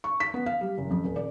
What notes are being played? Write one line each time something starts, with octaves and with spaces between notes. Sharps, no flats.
C#6
B6
B3
F5
G3
F#1
F2
D#1
D5